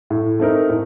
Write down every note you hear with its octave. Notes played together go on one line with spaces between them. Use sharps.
A2
A3 C4 D#4 A#4
A2